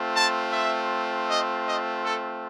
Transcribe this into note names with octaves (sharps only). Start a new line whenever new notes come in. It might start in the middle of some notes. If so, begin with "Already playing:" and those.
Already playing: A3 C4 F4
A5
E5
D#5
D#5
A4